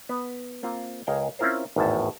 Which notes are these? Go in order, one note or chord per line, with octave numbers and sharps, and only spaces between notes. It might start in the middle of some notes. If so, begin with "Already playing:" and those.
B3
A#3 C4 F4
C#2 G#4 A#4 C#5 G5
C4 C#4 E4 F4 A#4 C5
G#1 E2 A2 A5